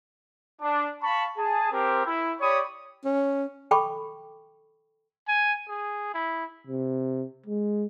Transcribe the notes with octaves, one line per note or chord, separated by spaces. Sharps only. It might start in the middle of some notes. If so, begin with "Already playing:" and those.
D4
F5 A5 B5 C#6
G#4 A5
C4 G4 A#4
E4
G4 C#5 D5 B5 C#6 D#6
C#4
A4 G5 B5 C#6 D6
G#5
G#4
E4
C3
G#3